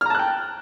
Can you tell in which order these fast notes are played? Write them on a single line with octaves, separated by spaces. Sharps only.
F6 A#5 A5 F#6 G5